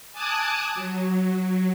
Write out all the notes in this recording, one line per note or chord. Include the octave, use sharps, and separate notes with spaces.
G#5 A5 D6 D#6 F#6 G#6
F#3